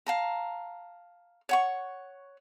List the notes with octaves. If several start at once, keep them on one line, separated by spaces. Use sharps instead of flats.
F5 A5 A#5
C#5 F#5 C#6